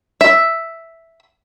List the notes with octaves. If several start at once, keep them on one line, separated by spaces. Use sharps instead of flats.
E5